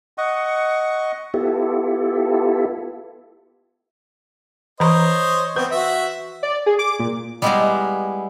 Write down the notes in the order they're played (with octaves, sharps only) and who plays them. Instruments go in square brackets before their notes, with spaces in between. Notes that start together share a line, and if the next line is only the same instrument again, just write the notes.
[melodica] D#5 F#5 C#6
[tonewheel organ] B3 E4 F4 G4 A4
[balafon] E3 A#5 [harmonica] C5 C#5 D#5
[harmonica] B3 C4 [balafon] B4
[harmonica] F#4 E5
[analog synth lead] D5
G#4
D6
A#2
[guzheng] G3 G#3 B3 E4 F5 A#5